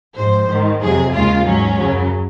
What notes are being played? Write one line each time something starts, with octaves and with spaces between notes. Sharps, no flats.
G#2 F3 G#3 C5
G#2 D#3 G#3
F2 C3 F#3 G#4
D#2 C#3 G#3 F4
G#2 F#3 C#4
F#2 C#3 F#3